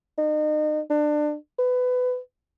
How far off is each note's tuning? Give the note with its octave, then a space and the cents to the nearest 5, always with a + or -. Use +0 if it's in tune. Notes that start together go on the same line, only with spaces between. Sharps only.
D#4 -35
D4 +25
B4 +20